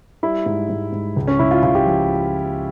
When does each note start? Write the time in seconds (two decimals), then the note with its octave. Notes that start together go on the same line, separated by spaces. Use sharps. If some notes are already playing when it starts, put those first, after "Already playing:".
0.23 G3 E4
0.46 G#2
0.69 G#2
0.92 G#2
1.16 C#2
1.28 C#4
1.39 C#2 E4
1.51 F4
1.63 C#2 F4
1.75 G4
1.86 F3